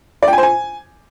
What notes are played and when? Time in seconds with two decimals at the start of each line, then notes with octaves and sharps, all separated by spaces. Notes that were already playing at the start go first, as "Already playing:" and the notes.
0.23 D5
0.28 G5
0.33 G#5
0.38 C5
0.43 G#5